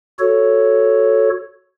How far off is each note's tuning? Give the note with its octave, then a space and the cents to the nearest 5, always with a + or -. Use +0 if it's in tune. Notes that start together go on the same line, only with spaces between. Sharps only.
F#4 +0 A4 +0 C#5 +0